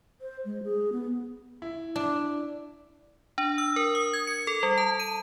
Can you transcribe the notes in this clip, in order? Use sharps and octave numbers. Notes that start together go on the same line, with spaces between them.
C5
G#3
G#4
B3
E4
D4
D4
E6
A#4
D#6
G#6
C#7
A4
G3
A5
D#7